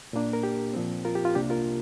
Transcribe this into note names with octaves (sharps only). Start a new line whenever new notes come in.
A#2 A#3 D4
A#4
G4
A#2 F3 C4
F4 A#4
G4
F4
C2 C3 A#3 D4 G4
F4 A#4